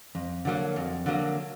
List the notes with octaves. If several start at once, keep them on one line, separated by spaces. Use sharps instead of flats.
F2
D3 F#3 A#3
F2
D3 F#3 A#3